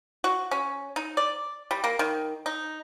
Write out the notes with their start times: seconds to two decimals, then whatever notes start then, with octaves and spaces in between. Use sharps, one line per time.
0.24 F#4
0.51 C#4
0.96 D#4
1.17 D5
1.71 G3
1.84 A#3
1.99 D#3
2.46 D#4